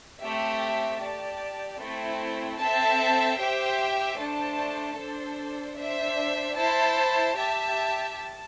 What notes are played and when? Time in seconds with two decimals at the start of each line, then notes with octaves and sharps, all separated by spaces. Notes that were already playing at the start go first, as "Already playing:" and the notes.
0.21 A3 C4 G4 E5
1.00 G4 D5 A5
1.80 A3 C4 E4
2.59 C4 A4 E5 A5
3.39 G4 C5 E5 G5
4.18 A3 D4 C5 A5
4.98 D4 A4 C5
5.77 D4 C5 E5
6.57 E4 C5 A5
7.36 G4 E5 A5
8.16 A5